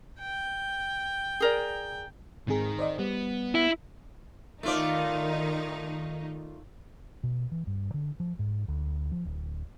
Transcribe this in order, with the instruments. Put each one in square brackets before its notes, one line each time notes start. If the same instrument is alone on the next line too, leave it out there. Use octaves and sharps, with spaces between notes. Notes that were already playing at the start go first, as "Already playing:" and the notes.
[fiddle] G5
[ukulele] G#4 A#4 D5
[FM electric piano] G#2 C4 G#4 [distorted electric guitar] D#3 A#4
[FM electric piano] C5 D5 D#5
[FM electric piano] G3 [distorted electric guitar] B3
[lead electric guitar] E4
[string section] D#3 D#4 [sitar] A3 F4 D5
[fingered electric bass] B2
E3
G2
D3
F3
G#2
D2
F3
D1